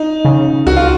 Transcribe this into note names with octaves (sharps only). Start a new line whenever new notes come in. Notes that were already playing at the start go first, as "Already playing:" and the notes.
Already playing: D#4
C#3
C#2 F#4
F4